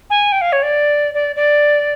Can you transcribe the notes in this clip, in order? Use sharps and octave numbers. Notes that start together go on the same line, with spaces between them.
G#5
G5
F5
C#5
D5
D5
D5